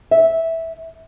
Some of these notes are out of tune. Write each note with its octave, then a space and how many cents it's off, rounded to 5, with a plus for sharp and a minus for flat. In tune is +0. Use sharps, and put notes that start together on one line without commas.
E5 -10